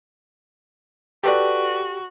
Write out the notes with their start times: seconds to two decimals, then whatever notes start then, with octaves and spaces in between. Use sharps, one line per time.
1.24 F#4 G4 A4 B4 D5